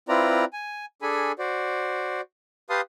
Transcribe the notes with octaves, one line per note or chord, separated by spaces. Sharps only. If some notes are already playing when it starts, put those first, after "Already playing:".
C4 E4 F4 B4 D5 A#5
G#5
D4 G#4 A4 G#5 B5
F#4 C5 D5
G4 B4 F5 A5 C6 D#6